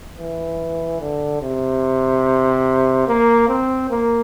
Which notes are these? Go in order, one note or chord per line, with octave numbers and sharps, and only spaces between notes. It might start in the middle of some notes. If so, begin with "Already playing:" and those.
E3
D3
C3
A#3
C4
A#3